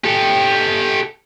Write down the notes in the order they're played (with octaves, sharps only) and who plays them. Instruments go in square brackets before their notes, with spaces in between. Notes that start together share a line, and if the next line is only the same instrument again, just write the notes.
[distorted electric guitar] G4 A4